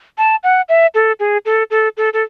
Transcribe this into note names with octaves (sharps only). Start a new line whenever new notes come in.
A5
F#5
E5
A4
G#4
A4
A4
A4
A4